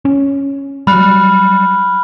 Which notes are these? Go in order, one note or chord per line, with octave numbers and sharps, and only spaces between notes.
C#4
F#3 G3 B5 F6 F#6